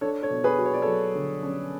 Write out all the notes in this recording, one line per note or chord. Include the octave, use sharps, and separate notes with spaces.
D4 A4 C#5
A4 C#5
B2
G#4 B4
F#4
C#5
D5
F#3 A4 C#5
D3
C#4